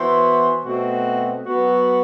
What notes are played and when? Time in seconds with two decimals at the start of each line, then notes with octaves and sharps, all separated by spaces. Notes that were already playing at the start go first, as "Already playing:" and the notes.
Already playing: E3 B3 F#4 C5
0.64 B2 A3 C4 F#4
1.46 F#3 B3 F#4